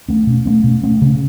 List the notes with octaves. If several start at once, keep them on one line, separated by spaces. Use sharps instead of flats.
A3 C#4
B2
A3 C#4
B2
A3 C#4
C#3